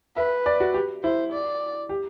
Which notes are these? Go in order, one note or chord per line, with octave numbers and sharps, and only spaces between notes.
B4 E5
D5
F#4
G4
E4 C5
D5
G4